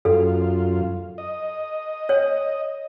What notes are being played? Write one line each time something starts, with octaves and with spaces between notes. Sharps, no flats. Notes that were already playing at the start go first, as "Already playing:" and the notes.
F#2 F4 A4
D#5
C#5